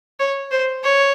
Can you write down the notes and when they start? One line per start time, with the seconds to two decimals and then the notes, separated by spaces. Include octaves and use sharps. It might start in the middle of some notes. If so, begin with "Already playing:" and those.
0.20 C#5
0.51 C5
0.84 C#5